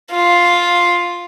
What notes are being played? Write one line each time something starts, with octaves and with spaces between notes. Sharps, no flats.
F4